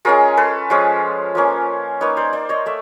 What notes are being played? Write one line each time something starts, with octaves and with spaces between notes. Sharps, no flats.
G#3 C#4 F4 G#4 A#4
A4 B4
F3 G#3 C#4 F4
F3 A#3 C#4
A#3 D#4 B4 C#5
C5 D5
C5 D5
C#5 D#5
A3 D5 E5